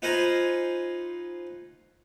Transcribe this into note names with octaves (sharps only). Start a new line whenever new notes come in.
D#4 F4 B4 C5 G#5 A#5